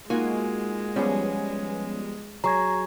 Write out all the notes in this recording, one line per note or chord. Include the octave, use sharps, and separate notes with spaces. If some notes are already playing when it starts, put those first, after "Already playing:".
G#3 A#3 D#4 F4 F#4 G#5
F3 G3 B3 C#4 G#4
F#3 G#4 A#5 C#6 G#6